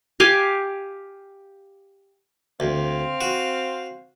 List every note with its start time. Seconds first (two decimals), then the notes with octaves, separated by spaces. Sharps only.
0.20 G4 F5 G#5
2.60 D2 C4 F5
3.21 F#4